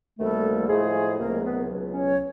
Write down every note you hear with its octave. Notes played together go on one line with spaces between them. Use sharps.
D2 C3 D#3 G3 A3 A#3 A4
A2 F3 G#3 A3 G#4
C#2 C3 D#3 F#3 A3 A#3 A#4
B3 B4
C#2 B2 F#3
C#4 C#5